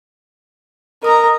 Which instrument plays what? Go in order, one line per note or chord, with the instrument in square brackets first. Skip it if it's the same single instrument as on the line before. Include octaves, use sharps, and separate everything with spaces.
[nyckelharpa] A#4 A#5 [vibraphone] D#5 D#6